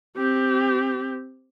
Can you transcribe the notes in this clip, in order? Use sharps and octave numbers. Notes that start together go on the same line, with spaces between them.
C4 G4